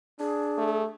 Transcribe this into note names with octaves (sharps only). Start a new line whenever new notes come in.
D4 G#4
A3